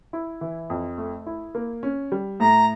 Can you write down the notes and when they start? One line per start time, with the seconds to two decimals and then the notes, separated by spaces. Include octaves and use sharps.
0.13 E4
0.41 E3
0.70 F2
0.98 A3
1.26 E4
1.55 A#3
1.83 C#4
2.12 G3
2.40 A2 A#5